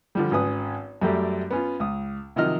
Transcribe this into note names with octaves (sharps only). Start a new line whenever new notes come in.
D3 F3 G3
G#1 C#4 B4 D#6
F#2 G3 A3 G4
B3 C#4 F4
C#2 D#6
C3 D#3 F3 F#3 D#5 F6